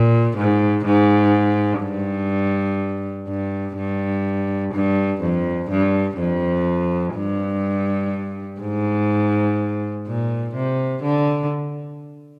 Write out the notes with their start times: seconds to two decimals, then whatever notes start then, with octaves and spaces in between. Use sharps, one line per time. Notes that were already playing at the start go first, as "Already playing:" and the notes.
Already playing: A#2
0.37 G#2
0.85 G#2
1.82 G2
3.28 G2
3.77 G2
4.73 G2
5.21 F2
5.70 G2
6.19 F2
7.15 G2
8.61 G#2
10.07 A#2
10.55 C3
11.03 D3